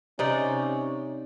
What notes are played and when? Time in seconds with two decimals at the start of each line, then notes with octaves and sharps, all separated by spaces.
0.19 C3 C#4 D#4 D5